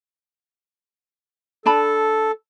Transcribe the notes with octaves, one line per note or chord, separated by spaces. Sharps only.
D4 A4 A5 B5